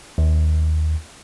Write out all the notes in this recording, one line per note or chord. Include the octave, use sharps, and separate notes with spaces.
D#2